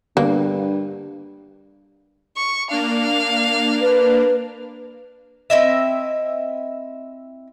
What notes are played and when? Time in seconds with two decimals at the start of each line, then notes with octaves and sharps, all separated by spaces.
0.17 G2 D3 A#3 B3
2.37 C#6
2.71 A#3 D4 F5
3.81 B4
5.50 C4 E4 D#5 E5